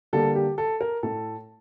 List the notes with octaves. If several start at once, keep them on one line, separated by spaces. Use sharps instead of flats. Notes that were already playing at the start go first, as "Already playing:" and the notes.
D3 G3 A#3 A4
G4
A4
A#4
A2 A3 A4